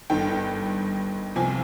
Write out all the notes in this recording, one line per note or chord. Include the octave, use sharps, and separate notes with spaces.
G1 G2 D#3 G5
C2 C3 F3 G#5